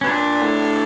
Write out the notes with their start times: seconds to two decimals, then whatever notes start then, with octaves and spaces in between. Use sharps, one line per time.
0.01 B2 C#4
0.07 A#2 D4
0.42 A2